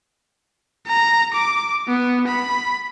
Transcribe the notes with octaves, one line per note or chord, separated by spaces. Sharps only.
A#5
D6
B3
B5